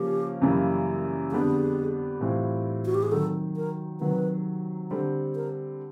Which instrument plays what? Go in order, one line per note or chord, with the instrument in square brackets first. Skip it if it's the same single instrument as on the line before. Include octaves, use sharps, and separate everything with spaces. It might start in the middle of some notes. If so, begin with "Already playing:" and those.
Already playing: [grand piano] C#3 F3 A#3 C#4 [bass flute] G4
[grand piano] F#2 C#3 E3 G3 A#3
[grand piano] F2 D3 G3 B3 D4 [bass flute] G#4
[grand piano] A2 E3 G3 C4 F4
[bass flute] F#4
G4
G#4
[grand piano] C3 D#3 F#3 [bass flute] A4
[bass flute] A#4
[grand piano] C3 D#3 F#3 [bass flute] B4
[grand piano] D3 G3 C4 [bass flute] A4
[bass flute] A#4